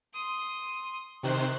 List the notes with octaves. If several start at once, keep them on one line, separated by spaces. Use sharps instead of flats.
C6 D#6
C3 D#3 C5 C#6 F#6